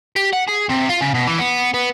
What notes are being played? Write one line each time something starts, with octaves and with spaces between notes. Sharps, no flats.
G4
F#5
G#4
C3
F4
C#3
B2
E3
B3
B3